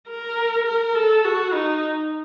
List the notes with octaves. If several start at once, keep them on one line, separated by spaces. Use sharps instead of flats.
A#4
A#4
A4
F#4
D#4